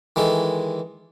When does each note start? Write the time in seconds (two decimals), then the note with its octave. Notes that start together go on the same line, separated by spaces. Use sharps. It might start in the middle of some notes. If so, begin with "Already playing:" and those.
0.16 D#3 E3 G#3 A4